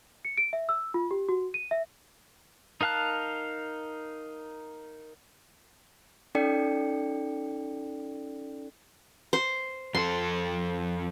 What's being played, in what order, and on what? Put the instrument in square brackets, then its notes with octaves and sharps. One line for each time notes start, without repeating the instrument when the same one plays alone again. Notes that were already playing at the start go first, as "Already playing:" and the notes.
[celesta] C#7
D7
E5
E6
F4
G4
F#4
D#7
E5
[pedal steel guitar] D#4 A#4 F5 A5 F#6
[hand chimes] C#4 D#4 A4 D5 G5 C#7
[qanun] C5
[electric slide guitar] F2 A4 [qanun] C6